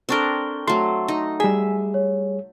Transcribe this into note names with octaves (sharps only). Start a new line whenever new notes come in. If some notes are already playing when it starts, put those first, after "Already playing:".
C4 D4 A4 A#4 C#6 G7
F#3 A3 C6
D#4
G3 G#4 E5 G#5
C#5